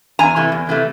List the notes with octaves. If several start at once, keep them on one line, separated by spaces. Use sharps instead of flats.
E2 G#5 A#5
C3 E3 A3
E2
C3 E3 A3